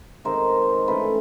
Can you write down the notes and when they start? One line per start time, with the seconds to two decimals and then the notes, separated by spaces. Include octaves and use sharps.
0.25 D#3 G#3 C4 D#4 A#4 C5
0.87 E3 A3 C#4 A4 B4